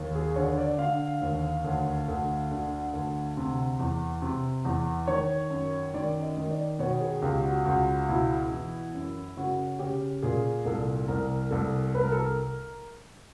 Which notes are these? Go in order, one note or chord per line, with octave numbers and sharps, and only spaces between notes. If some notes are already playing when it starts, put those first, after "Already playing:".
Already playing: D#2
G#4
D3 C#5
D5
D3 F5
D#2
D2
D2
D3
D2
C3
E2
C3
E2
D#3 C#5
F#2
D#3 D5
D#5
D#3
D5
B2 C#5
G#4
C#2 G4
F#4
C#2 F#4
B2 E4
E3
F#2
C#3 F#4
C#3 G4
A#2 G#4
C2 A4
C2 A#4
C2 A4
C2 B4
A#4
A4
A#4